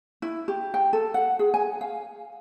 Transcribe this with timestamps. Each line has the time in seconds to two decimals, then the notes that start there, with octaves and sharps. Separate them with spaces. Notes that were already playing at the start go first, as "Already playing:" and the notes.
0.22 E4
0.48 G4
0.74 G5
0.93 A4
1.14 F#5
1.39 G#4
1.54 G#5
1.81 F5